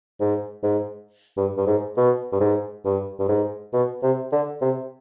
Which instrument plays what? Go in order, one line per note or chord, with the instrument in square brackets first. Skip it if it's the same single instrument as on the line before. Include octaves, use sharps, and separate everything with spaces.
[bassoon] G#2
G#2
G2
G2
G#2
B2
G2
G#2
G2
G2
G#2
B2
C3
D3
C3